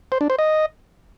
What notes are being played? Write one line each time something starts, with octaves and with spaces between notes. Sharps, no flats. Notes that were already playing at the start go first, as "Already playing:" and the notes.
C5
D4
C5
D#5